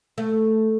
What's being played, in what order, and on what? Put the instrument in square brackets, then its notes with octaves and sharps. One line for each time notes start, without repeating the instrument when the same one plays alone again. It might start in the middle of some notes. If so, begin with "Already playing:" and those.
[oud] A3